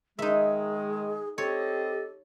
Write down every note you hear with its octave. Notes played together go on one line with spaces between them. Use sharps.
D#3 G#3 D#4 G#4 E5
C4 G4 A4 C#5 D#5